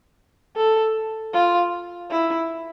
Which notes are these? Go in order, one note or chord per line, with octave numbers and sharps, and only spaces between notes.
A4
F4
E4